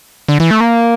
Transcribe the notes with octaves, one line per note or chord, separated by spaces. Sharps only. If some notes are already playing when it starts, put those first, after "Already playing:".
D3
E3
A3
A#3